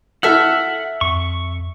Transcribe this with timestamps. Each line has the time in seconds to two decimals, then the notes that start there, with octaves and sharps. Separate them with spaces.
0.23 E4 A4 E5 F#5 E6 F6
1.01 F2 C#6